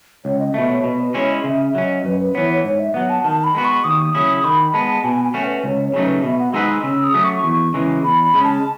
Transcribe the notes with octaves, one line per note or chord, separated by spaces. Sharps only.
C#2 C#5
D#5
B2 A3 E5
C#5
B2 D#5
B4
G#3 C#4 E4 C#5
D#5
C#3 E5
E5
F#3 C#4
D#5
F#2 B4
B4
E3 B3 C#5
C#5
G#2 C#5
E5
F#3 B3 F#5
A5
D#3 A5
B5
G#3 B3 F#4
C#6
D#2 D#6
C#3 F#3 C#4 E4 D#6
D#3 B5
G#3 B3 A5
B2 G#5
G#5
A3 C#4 F#4
B4
C#2 C#5
C#5
C#3 F#3 A3 D#4
B4
B2 E5
F#5
G#3 D#4 G#4 B4 E6
E6
C#3 E6
D#6
F#3 A3 C#4
C#6
E2
C#3 E3 G#3
E2 B5
B5
C#3 G#3 C#4
A5